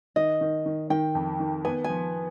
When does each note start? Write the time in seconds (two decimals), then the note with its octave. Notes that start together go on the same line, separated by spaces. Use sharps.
0.16 D#3 D#5
0.41 D#3
0.66 D#3
0.90 D#3 G5
1.15 F2
1.40 D#3
1.65 B3 G#5
1.84 G#5
1.89 F3